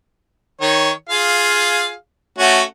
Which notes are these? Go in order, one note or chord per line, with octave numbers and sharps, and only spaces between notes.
D#3 C#5
F4 G#4 F5
A3 C#4 F#4